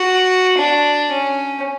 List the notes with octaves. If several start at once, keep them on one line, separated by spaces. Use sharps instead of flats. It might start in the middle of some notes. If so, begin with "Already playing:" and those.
Already playing: F#4
D4
C#4